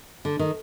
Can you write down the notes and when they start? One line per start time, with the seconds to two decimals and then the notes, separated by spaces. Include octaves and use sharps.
0.25 D3
0.39 D#3